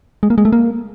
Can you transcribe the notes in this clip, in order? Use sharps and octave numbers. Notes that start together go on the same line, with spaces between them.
G#3
A#3
G#3
A3
A#3